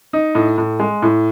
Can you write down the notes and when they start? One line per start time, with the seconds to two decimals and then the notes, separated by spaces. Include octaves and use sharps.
0.13 D#4
0.35 A2
0.58 A2
0.80 G#3
1.02 A2